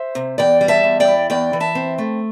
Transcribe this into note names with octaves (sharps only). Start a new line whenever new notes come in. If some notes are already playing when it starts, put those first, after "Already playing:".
Already playing: C5 E5
C3
E2 D5 G5
G3
E5 A5
E2
D5 G5
E4
E2 D5 G5
E3
E5 A5
C4
A3